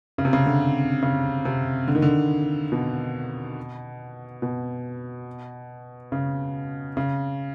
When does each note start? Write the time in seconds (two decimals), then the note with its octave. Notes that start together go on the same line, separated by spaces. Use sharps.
0.18 C#3
0.25 C3
0.33 C#3
0.46 D3
1.02 C#3
1.45 C3
1.88 D3
1.95 D#3
2.02 D3
2.72 B2
4.42 B2
6.12 C#3
6.97 C#3